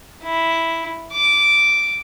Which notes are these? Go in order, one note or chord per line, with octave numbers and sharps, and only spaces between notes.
E4
D6